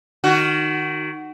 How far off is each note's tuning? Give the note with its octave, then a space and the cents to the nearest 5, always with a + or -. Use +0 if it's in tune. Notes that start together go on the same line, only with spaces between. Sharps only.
D#3 -15 F#4 +10